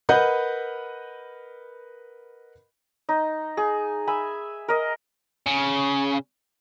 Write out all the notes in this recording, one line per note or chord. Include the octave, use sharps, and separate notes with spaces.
A#4 B4 D#5 F#5 B5 G6
D#4
G#4
E5 G#5 B5
A#4 D#5
C#3